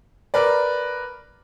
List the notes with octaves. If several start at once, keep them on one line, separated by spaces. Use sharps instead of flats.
A#4 B4 D5